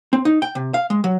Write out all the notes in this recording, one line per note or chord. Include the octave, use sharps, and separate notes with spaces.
C4
D#4
G5
C3
F5
G#3
F#3